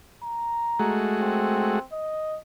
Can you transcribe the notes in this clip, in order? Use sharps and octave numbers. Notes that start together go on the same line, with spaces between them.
A#5
G#3 A3 F#4
C4
D#5